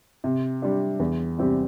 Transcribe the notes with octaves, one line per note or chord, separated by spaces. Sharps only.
C3
G3 D4
E2
C3 G3 C4 G4